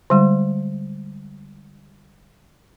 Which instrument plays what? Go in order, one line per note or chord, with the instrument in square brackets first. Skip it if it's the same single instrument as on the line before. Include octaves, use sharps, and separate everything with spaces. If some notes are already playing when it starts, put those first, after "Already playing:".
[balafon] D3 G3 G#3